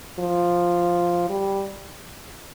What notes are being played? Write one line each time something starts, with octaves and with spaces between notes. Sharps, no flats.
F3
G3